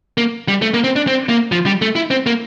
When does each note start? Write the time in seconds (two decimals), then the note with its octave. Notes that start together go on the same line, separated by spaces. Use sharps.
0.18 A#3
0.48 G3
0.62 A3
0.74 A#3
0.84 C4
0.96 D4
1.07 C4
1.29 A#3
1.52 F3
1.66 G3
1.82 A3
1.96 E4
2.11 C4
2.26 A#3